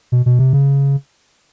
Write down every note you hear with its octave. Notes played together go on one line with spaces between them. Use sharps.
B2
B2
C3
C#3